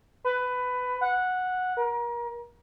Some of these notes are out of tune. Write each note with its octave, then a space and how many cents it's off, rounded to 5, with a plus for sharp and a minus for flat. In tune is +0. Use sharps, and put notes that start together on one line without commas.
B4 +15
F#5 -10
A#4 +30